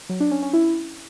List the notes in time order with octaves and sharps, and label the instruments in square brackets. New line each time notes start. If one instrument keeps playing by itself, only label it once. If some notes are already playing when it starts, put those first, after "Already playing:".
[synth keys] F#3
D4
C#4
C#4
E4